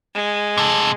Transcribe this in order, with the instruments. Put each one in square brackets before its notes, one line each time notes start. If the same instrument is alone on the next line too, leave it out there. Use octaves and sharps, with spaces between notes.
[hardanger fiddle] G#3
[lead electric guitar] C3 A4